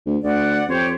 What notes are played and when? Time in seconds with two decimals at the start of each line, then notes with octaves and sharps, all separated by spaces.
0.06 D2
0.24 D2 D5 F#5
0.68 F2 G4 C5 C#5